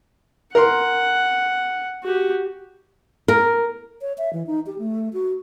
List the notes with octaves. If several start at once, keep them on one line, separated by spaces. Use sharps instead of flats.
A#4 F#5 C6
F#4 G4
A#4
C#5
E5
E3
D#4
G4
A3
F#4